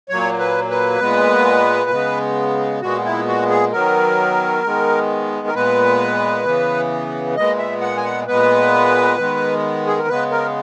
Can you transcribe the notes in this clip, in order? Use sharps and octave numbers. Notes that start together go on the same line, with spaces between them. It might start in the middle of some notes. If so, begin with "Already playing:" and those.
A#2 F#3 A#3 C#5
B4
B4
A#2 G#3 B3
C#3 G#3 B3
A#2 G#3 B3 F#4
E4
F#4
G#4
D#3 F#3 B3 A#4
D#3 G#3 B3
A#4
A#2 G#3 B3 B4
C#3 E3 B3
A#2 G#3 B3 D#5
E5
F#5
G#5
F#5
A#2 G#3 B3 B4
D#3 G#3 B3
G#4
A#4
C#3 G#3 B3 B4
A#4